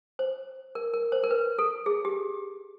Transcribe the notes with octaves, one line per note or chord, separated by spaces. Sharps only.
C5
A#4
A#4
C5
A#4
B4
A4
G#4
G4